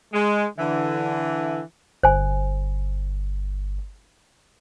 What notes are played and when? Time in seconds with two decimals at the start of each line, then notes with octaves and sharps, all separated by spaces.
0.13 G#3
0.58 D3 E3
2.03 G1 C5 G#5